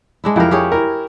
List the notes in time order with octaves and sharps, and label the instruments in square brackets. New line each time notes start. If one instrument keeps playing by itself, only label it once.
[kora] G#3 D4 E4
[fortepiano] F2 E4 [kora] G4 A#4
[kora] G4 G#4 C#5
[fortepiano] E4 A#4